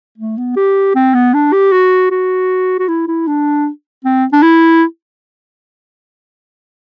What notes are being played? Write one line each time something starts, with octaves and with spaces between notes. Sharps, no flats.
A3
B3
G4
C4
B3
D4
G4
F#4
F#4
F#4
E4
E4
D4
C4
D4
E4